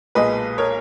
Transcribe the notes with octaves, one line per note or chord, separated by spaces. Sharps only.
B1 A#2 G#3 B4 D#5
A#4 C#5